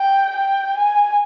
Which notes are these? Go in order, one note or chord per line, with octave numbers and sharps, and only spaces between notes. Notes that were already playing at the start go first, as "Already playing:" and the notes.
Already playing: G5
G5
G#5